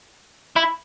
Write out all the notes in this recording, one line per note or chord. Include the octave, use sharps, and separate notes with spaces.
E4